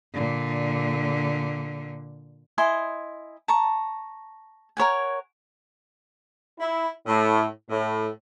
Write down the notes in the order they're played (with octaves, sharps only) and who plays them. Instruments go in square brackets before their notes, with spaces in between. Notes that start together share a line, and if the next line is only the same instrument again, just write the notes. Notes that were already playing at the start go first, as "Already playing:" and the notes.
[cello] A#2 D3
[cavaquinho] E4 D#5 G#5 C6
A5 A#5 C#6
A#4 C#5 F#5 G#5
[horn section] E4
A2
A2